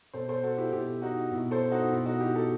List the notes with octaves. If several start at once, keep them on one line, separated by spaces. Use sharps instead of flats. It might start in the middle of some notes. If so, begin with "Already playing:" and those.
B2 A4 C5
A4 C5
F#4 A4
E4 G4
B2 E4 G4
D#4 F#4
B2 E4
A4 C5
D#4 F#4
B2 E4
D#4 F#4
E4 G4
F#4 A4